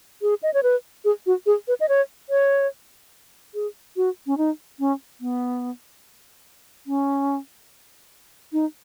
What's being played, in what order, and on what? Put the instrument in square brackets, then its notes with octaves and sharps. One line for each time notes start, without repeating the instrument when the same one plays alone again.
[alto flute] G#4
D#5
C#5
B4
G#4
F#4
G#4
B4
D#5
C#5
C#5
G#4
F#4
C#4
D#4
C#4
B3
C#4
D#4